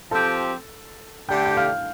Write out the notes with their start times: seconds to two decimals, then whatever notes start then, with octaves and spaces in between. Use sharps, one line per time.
0.11 F3 C4 G4 A4 A5
1.29 D3 A3 D4 G4 G5 G6
1.46 G6
1.57 F5 F6